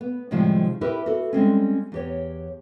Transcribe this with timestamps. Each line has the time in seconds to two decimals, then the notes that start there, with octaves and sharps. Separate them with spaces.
0.01 B3
0.31 A2 C3 D#3 F3 G3 G#3
0.81 E4 G4 A#4 B4
1.06 F#4 A4
1.33 G3 G#3 C4 C#4
1.92 E2 G4 C#5